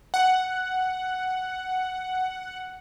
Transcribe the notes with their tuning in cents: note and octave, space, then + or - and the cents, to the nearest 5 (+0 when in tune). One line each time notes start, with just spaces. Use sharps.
F#5 +5